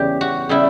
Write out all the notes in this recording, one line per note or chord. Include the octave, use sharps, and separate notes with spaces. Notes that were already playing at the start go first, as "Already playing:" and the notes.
Already playing: E2 C#3 G3 G4
F#4
C#3 G3 E4